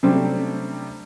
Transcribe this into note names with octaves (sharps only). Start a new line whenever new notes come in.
C3 F#3 G3 A3 C4 D4